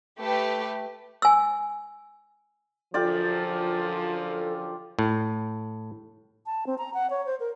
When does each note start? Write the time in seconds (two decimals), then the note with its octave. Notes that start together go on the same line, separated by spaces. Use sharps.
0.19 A3 G4 B4
1.22 G#5 E6
2.94 F#2 D3 F3 F4 G4 A4 D5
4.99 A2
6.46 A5
6.67 C4
6.78 A#5
6.94 F#5
7.10 C#5
7.26 C5
7.40 A#4